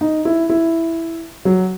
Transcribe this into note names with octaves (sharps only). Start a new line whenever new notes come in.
D#4
E4
E4
F#3